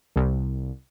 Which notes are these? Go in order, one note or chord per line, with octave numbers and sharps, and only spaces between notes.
C2